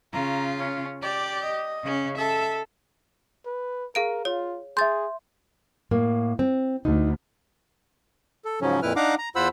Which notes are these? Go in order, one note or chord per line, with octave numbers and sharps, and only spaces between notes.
C#3 F4 A#5
C#4
G4 D5
D#5
C#3 C#4
A4 E5
B4
G#4 A#4 F5 D7
F4 C#5
G#4 E5 C6 G6 A6
A2 A#3
C4
D2 D#4
A4
G#2 C#3 F3 F#3 C#4
F2 A#2 E4 B4 F6
D4 D#4 F5 F#5 A#5 D6
A#5
E2 F4 C5 F#5 B5 E6